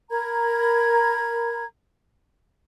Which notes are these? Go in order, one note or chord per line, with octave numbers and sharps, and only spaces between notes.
A#4 A#5 B5 G#6